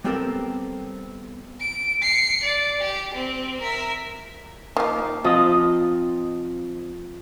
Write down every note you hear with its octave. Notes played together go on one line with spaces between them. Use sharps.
G3 B3 C4 G4 A4 A#4
D7
C7 C#7
D5
G4
C4
A#4 E5
D#3 F3 A#3 D#4 F5
F3 C4 D#5